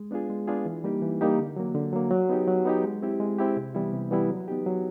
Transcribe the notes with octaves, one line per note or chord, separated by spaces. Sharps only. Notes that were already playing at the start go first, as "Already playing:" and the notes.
Already playing: G#3
B3 D4 F4 G#4
G#3
B3 D4 F4 G#4
E3
G3 A#3 D#4 G4
E3
G3 A#3 D#4 G4
D3
F#3 A#3
D3
F#3 A#3
F#3
B3 D#4 G4
F#3
B3 D#4 G4
G#3
C4 E4 G4
G#3
C4 E4 G4
C3
E3 G3 B3 E4
C3
E3 G3 B3 E4
F#3
B3 D#4 G4
F#3